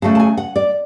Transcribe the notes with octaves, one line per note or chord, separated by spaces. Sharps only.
C#3 F#3 A3 A5
A5
G#5
F#5
D5